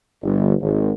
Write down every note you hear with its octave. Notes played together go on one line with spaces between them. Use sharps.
G1
G#1